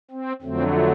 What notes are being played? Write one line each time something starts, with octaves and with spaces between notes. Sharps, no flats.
C4
F2 D3 F#3 A3 C4